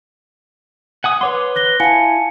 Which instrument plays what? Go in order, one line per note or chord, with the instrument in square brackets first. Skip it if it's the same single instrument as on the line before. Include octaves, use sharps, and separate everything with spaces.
[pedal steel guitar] F#5 G#5 D#6
[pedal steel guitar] B4 C#5 C6 [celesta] F#5 D6
[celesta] F#6 A#6 G7
[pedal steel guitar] E4 [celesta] F5 F#5 C#7 [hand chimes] G#5 A5